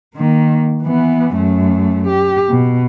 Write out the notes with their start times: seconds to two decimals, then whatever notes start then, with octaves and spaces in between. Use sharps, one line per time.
0.16 D#3 A#3
0.83 E3 B3
1.35 F#2 A3
2.07 G4
2.50 B2